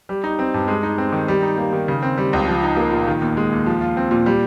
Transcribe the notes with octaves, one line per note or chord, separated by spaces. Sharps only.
G3
D#4
C4
G2
G#3
D#4
C4
D#3
G3
D#4
A#3
D#3
C#3
C4
G3
C#2
F3
D#4
A#3
A#2
D#3
D#2
G#3
D#2
F3
F4
C4
A#2
G3